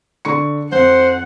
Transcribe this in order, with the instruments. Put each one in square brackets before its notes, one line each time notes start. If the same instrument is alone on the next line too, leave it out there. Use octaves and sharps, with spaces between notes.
[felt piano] D3 C#6 C#7
[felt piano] F2 [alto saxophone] C5 [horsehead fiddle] F#5